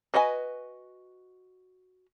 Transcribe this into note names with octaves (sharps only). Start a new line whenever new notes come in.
F#4 B4 D#5 F#5 G#5